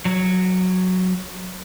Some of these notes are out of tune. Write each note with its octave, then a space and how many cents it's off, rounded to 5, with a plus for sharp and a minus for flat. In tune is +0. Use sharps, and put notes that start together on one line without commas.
F#3 -5